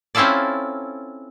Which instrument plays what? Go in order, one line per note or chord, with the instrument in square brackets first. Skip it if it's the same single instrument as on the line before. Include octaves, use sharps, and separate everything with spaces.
[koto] C4 C#4 E4 F4 A4 D5